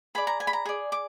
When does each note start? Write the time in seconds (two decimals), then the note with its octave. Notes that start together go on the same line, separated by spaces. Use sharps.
0.15 G#4 D5 B5
0.27 A#5
0.40 G#5
0.47 B5
0.53 A#5
0.65 G#4 D5
0.92 D6